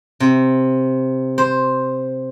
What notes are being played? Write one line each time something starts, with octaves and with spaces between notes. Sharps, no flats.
C3
C5